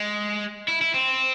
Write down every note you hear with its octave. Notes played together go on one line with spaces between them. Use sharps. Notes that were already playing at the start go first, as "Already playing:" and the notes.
Already playing: G#3
E4
E4
C4